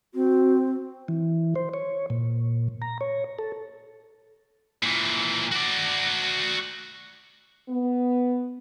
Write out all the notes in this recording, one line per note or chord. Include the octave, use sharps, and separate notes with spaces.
C4 F#4
E3
C5
C#5
A#2
A#5
C#5
A4
A#2 E3
F#4 D5
B3